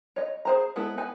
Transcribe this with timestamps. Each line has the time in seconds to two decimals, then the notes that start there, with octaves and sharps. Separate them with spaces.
0.16 C#5 D#5
0.45 G#4 C5 A#5
0.76 G#3 B3 E4 A4
0.98 B3 B4 G#5